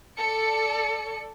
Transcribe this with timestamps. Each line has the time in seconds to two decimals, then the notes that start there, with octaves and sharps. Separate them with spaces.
0.17 A4 D5 C#7